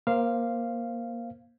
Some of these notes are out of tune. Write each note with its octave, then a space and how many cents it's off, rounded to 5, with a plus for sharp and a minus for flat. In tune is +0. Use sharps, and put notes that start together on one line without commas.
A#3 +20 C5 +10 F5 -10